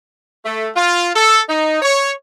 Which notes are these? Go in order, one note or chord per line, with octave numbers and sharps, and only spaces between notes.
A3
F4
A4
D#4
C#5